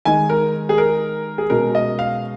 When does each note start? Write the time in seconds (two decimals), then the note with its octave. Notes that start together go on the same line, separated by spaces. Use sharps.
0.05 D#3 G#3 D#4 G#5
0.30 A#4
0.69 G#4
0.78 A#4
1.38 G#4
1.50 B2 G#3 C#4 A#4
1.75 D#5
1.99 F5